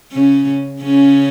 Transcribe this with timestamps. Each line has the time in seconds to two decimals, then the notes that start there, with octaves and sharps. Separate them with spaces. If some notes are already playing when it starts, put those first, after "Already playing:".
0.12 C#3 C#4
0.82 C#3 C#4